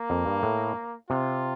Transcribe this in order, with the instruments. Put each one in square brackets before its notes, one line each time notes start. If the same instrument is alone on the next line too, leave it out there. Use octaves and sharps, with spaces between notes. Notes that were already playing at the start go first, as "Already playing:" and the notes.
Already playing: [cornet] A#3
[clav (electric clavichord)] F2
G2
A2
[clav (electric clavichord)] C3 [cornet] F4